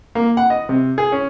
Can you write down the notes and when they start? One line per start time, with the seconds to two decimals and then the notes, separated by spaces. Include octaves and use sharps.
0.15 A#3
0.37 F#5
0.50 D#5
0.69 C3
0.98 G#4
1.12 C#4